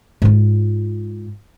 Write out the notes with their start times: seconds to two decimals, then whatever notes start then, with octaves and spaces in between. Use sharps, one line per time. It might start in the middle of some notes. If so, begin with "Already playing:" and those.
0.22 G#2 F4